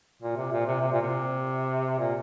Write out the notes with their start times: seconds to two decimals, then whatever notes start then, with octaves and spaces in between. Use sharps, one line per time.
0.22 A#2
0.36 C3
0.52 A#2
0.67 C3
0.81 C3
0.92 A#2
1.02 C3
1.99 A#2